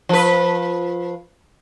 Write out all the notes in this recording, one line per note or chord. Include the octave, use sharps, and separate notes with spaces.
F3 B4